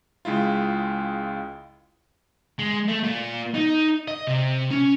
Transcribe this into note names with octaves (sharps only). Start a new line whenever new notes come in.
C#2 G#3 E4 F4
G#3
A3
A#2
D#4
D#5
C3
C#4